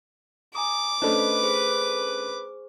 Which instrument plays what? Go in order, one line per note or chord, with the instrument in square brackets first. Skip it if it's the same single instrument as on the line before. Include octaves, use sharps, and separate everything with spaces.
[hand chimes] G#5 A#5 D#6 [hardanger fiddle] D6
[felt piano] A3 C#4 D4 [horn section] B4 [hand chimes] C5 D#5
[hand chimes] G#4 C5